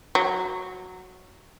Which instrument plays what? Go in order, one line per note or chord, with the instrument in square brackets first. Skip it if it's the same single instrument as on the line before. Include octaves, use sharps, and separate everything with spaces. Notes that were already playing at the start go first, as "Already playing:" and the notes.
[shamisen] F#3